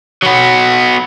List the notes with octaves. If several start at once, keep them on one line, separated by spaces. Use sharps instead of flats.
F#3 B3